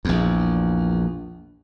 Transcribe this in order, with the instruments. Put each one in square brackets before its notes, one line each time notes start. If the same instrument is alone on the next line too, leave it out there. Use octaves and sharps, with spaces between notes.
[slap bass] A#1 E2